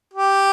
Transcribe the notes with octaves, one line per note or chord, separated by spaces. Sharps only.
G4